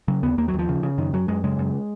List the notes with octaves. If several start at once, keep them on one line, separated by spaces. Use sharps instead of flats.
C#3 F#3
D#2 B3
D#2 A#3
F#3
D#2
F3
C#3
C#3
F#2 D#3
F#2 F#3
F#2 G#3
C#3 G#3
F#2